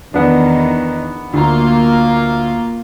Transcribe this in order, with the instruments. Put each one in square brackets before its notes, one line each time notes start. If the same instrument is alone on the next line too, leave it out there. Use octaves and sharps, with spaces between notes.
[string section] E2 D#3 [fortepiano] B3 D4
[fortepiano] D2 A#5 [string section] A#3 F4